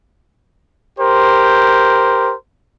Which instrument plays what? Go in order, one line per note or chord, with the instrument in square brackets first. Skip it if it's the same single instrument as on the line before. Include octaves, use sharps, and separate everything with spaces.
[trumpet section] G4 A#4 C5